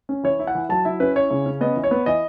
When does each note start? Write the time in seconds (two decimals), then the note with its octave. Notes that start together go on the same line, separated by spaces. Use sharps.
0.09 C#4
0.23 E3 C#5
0.39 E4
0.47 F#5
0.55 E3
0.69 F#3 A5
0.85 E4 E5
1.00 C#4 B4
1.16 E4 C#5
1.30 C#3
1.46 C#4
1.61 B3 D#5
1.76 E3
1.84 C#5
1.91 B3
2.06 E3 D#5